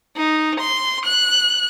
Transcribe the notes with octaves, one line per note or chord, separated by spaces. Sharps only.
D#4
C6
F#6